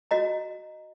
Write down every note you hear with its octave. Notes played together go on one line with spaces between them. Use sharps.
F#4 D#5 A#5